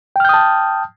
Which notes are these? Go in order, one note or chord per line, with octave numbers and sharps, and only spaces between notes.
G5 A5 D#6 F6 G6